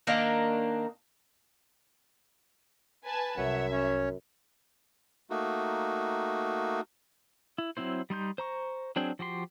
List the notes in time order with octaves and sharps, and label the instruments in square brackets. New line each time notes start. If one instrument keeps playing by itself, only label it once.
[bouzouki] D#3 A#3 D4 A#4
[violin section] B4 G#5 A5
[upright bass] C2 [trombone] F#2 [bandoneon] C#5 F#5 [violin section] E5
[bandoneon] C#4 C#5
[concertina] A3 A#3 D#4 F#4
[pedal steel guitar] E4
F#3 C4 E4 C5
G3 D#4 C6 G6
C5 A#5 C#6
F#3 C4 D4 G#4 G5
F3 F#4 G4 C6